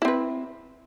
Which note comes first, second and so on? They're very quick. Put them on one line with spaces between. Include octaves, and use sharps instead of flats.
E4 C4 B4